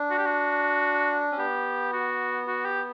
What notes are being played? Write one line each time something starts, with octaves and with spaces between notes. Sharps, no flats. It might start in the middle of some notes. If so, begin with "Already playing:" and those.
Already playing: D4
F#4
G4
F#4
C#4
B3 G4
F#4
F#4
G4